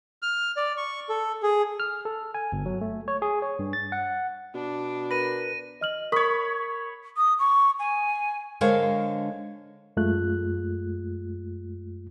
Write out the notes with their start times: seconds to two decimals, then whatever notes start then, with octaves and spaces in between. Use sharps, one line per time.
0.22 F6
0.57 D5
0.77 C#6
1.09 A4
1.43 G#4
1.80 F6
2.05 A4
2.34 G#5
2.52 G1
2.66 F#3
2.81 A3
3.08 C#5
3.22 G#4
3.42 C#5
3.59 G2
3.73 A6
3.92 F#5
4.55 B2 D4
5.11 A#4 B4 B5 A#6 D#7
5.81 D#5 F6 F#7
6.12 A#4 C#5 B5 C#6 D#6
7.17 D#6
7.39 C#6
7.79 G#5
8.61 D3 G#3 A#4 C5 C#5 F5
9.97 F#2 G#3 A3 F4 F#6